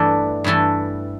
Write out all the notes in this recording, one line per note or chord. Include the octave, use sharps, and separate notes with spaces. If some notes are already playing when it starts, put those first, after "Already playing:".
Already playing: G2 E3 A3 D4
G2 E3 A3 A4